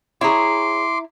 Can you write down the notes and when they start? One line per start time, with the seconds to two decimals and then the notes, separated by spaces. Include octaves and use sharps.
0.21 E4 G#4 C#5 A#5 C6 D6